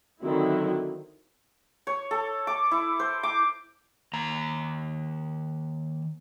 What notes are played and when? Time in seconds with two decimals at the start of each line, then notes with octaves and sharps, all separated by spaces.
0.22 D3 D#3 F#3 C4 E4
1.87 C#5
2.11 A4
2.47 D6
2.71 E4
3.00 C5
3.23 D6
4.13 D#3 A#3 A#5